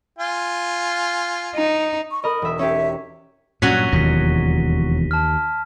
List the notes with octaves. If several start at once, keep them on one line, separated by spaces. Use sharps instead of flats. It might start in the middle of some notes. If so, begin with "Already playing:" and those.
F4 G#5
D#4
C#6
A#4 D#5 B5
E1 E5
C#4 G4 E5
G2 A#2 F#3 C#4 F#4 B6 D#7 G7
E1 D#2 F3 A#6 B6
A5 F6